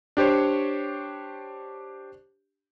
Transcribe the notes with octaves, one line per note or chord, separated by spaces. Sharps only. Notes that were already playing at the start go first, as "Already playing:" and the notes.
D4 G4 C5 C#5